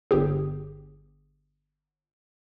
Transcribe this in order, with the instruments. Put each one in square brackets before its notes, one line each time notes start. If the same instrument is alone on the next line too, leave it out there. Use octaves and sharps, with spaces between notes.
[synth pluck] G1 G4 G#4